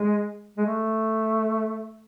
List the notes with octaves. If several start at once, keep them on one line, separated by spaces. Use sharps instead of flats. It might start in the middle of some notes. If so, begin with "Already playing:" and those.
Already playing: G#3
G#3
A3